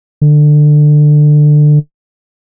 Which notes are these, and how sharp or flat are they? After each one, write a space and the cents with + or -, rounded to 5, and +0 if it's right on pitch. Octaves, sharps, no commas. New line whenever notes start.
D3 +20